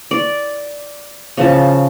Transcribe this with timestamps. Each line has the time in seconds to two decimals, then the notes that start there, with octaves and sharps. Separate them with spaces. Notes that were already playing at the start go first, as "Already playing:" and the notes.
0.11 D5
1.37 C#3 F3 A5